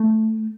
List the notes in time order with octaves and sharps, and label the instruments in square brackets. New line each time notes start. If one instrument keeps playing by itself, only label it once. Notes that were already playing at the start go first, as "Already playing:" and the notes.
Already playing: [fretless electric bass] A3